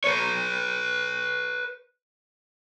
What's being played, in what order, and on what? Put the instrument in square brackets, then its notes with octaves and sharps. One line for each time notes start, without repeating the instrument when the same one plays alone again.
[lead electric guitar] B4 C#5